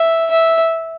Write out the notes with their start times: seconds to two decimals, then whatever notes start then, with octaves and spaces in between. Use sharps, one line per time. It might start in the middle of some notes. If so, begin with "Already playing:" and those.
Already playing: E5
0.31 E5